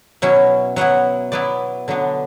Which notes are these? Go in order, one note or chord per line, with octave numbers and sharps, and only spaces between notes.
B2 F#3 C#4 E4
F#3 B3 E4 F#5
F#3 B3 E4 D5
D3 F#3 B3 D4